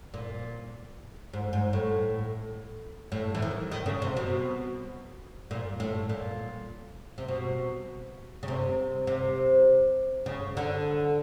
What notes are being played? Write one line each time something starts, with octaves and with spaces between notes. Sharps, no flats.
A#2
G#2
G#2
A2
A2
E3
D#3
D#3
C#3
C3
B2
A#2
A2
A#2
C3
B2
C#3
C3
C3
C#3
D3